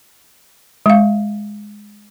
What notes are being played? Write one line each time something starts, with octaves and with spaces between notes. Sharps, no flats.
G#3 F5